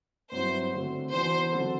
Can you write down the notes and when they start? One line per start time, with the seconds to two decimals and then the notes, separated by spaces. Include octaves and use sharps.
0.32 G2 F#3 C4 E4 C5
0.72 D3 A3 C4 F#4
1.12 E3 B3 D4 F#4 C5
1.52 D3 F#3 C4 F#4 A4